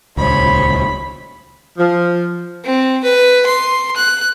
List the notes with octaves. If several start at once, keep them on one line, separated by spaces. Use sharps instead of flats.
D#1 C#2 C5 C#5 B5
F3
C4
B4
C6
F#6